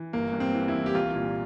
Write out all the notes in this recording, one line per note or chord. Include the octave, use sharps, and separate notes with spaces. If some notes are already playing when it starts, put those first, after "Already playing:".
Already playing: E3
G1 A#3
G2
C4
E3
E4
E3
G4
C2 F4
A#2